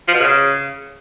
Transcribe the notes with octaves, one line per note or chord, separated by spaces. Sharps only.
F3
B2
C#3